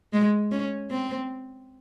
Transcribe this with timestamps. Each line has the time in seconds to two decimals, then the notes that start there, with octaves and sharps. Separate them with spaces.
0.13 G#3
0.52 C#4
0.91 C4